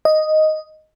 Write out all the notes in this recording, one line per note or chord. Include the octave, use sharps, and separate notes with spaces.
D#5